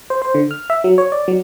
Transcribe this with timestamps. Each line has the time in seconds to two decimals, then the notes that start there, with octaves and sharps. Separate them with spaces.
0.10 C5
0.22 C5
0.34 D3
0.51 F6
0.70 E5
0.84 F#3
0.98 C#5
1.12 D5
1.28 F#3